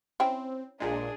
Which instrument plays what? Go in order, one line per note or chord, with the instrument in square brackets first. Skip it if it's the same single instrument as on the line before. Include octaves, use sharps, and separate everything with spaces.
[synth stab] C4 [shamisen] C#4 E4 G5
[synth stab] A#1 A#2 G#3 [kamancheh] D4 G#4